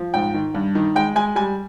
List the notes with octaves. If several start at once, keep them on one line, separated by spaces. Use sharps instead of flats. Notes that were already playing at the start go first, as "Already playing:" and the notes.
Already playing: F3
G#2 G5
D#3
G2
D#3
G#3 G5
G#3 G#5
G3 G#5